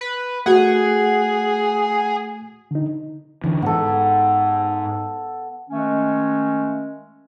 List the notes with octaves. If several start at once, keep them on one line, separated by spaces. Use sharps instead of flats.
B4
A3 F#4 G#4 F#5
D3 D#4
D3 E3
G#2 B3 A4
D#3 G#3 A3 C#4